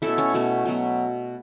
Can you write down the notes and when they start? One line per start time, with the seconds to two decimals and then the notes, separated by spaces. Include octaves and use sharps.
0.02 B2 A3 C#4 E4 A4
0.18 C#4
0.34 B2 A3 C#4
0.66 B2 F#3 B3